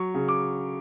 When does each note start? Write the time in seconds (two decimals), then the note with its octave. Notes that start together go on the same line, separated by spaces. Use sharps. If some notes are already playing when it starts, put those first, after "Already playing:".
Already playing: F#3 C#6
0.14 C#3
0.29 D6